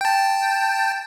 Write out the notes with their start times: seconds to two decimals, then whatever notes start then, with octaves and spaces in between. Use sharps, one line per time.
0.01 G5 A5